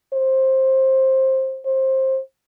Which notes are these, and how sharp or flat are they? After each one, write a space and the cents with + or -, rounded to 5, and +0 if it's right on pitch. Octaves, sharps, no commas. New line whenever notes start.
C5 +15
C5 +20